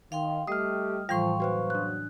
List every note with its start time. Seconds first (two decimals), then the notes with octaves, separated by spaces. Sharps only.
0.12 D#3 F5 G5 C6
0.47 G3 A3 G4 D#5 D#6 F6
1.09 A2 E3 F3 G3 F5 G5 C6 C#6
1.40 F#1 F#3 F#4 B4 C5
1.70 D4 F#6